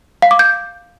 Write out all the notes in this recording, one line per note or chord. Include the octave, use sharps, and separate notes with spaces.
F5
D6
G6